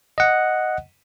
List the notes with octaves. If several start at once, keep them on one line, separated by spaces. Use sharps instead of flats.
D#5 F#5